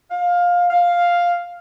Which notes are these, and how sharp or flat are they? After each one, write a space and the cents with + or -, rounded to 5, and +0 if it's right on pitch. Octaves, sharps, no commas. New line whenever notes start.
F5 +15
F5 +5